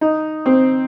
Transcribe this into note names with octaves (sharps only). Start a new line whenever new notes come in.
D#4
C4